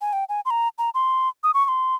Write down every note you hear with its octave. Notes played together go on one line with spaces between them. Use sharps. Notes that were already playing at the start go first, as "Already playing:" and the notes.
G#5
G5
G#5
C6
A#5
A#5
C6
D#6
C#6
C#6
C6